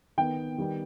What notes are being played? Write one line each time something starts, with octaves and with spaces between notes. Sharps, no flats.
D#3 B3 G5
D#3 G3 B3